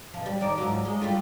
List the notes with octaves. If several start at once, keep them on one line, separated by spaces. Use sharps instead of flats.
B2 F3
G3
D#3 D5
G#2 F3 F#3
G#3
G3 A3 F4